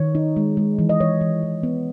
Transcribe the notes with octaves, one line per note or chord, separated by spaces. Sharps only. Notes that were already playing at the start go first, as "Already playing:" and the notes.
Already playing: D#3 C#5
D#4
G#3
G#3
E3
D#5
E3 C#5
E3
E3
B3